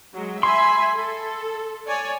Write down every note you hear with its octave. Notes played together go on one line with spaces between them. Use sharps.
F#3 G#3
E5 G#5 B5 C6
A4
C#5 D5 G#5